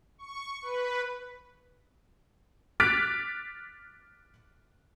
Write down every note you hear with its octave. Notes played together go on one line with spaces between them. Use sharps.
C#6
B4
D6 F6 F#6 A6 B6 D7